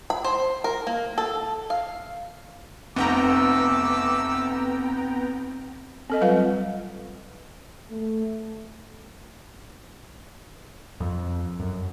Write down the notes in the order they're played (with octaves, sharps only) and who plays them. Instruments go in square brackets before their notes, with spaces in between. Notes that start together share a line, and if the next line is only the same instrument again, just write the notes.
[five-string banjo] B5
C5
A#4
A#3
A4
F5
[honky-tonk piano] F1 [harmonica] A3 D6 E6 [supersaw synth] B3 G5 A#5 [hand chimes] C4
[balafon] C4 A4 D#5
F#3 G3 F4 B4 F5 F#5
[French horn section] A3
[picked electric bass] F2
F#2